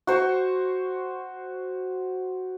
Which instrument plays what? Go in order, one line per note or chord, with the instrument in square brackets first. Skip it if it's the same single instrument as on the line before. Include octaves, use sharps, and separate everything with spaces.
[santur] F#4 C5 C#6